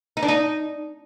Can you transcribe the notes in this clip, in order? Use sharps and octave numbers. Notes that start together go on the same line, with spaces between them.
D#4
D4
D#4